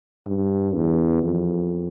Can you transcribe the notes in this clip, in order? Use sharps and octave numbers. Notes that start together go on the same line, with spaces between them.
G2
E2
F2